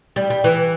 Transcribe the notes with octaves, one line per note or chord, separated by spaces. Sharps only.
G3
G3
E3